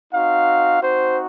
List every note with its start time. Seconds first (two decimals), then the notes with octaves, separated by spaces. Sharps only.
0.11 C4 D#4 F#4 F5
0.81 C4 D#4 F#4 C5